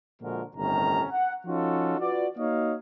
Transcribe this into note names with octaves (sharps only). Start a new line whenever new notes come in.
A#2 D3 F3 G#3 F#4 A#4
G1 A2 C3 D#3 C#4 A#5
F#5
F3 C#4 D#4 F4 F#4 A4
F4 F#4 B4 D5
A#3 D#4 F#4 C#5 D#5 F5